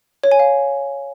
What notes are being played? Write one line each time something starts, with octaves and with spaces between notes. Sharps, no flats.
C#5
G#5
F5